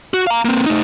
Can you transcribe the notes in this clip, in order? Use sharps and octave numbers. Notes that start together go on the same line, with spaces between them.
F#4
F5 A#5
A#3 C4
A3 D#4